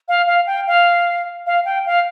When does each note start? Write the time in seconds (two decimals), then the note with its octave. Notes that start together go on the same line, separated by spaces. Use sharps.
0.08 F5
0.27 F5
0.47 G5
0.67 F5
1.47 F5
1.65 G5
1.86 F5